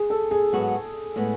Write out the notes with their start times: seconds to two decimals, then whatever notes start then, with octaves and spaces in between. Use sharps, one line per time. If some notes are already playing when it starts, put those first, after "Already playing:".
Already playing: G#4
0.10 A4
0.31 G#4
0.53 G#2 F#3 B3 F#4
1.16 A2 G#3 B3